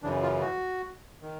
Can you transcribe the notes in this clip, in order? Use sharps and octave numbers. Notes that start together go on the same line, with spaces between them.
F#2 C#3 E3 D4
F4
F#4
D#3